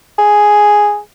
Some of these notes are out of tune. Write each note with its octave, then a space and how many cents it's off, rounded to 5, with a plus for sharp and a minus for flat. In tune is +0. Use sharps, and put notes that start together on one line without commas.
G#4 +0